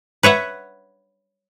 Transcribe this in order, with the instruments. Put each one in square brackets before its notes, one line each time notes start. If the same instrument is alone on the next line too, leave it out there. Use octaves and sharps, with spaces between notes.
[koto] B4 C#5 E5 F#5